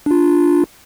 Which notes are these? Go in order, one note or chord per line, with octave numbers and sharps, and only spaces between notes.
D4 F4